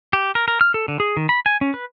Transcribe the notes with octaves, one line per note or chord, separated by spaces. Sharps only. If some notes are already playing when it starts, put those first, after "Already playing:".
G4
A#4
A#4
F6
A4
D3
G#4
D#3
B5
G#5
C#4
B4